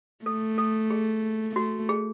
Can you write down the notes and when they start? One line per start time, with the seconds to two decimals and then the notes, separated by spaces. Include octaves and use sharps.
0.25 A3 A4
0.58 A4
0.90 G#4
1.56 A3 F#4
1.89 G#4